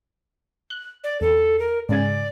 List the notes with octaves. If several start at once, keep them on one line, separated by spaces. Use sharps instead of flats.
F#6
D5
E2 A4
A#4
G#2 C#3 D5 G#5